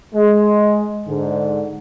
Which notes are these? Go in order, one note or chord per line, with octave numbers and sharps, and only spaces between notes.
G#3
G#2 D3